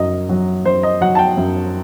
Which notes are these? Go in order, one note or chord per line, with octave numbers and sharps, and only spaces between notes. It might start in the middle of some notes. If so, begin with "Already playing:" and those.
Already playing: F#2 F#3 D#5
F#3
F#2 C5
D#5
F#3 F#5
A5
G5
F#2